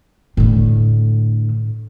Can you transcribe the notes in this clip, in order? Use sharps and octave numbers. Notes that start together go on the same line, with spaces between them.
A2 D3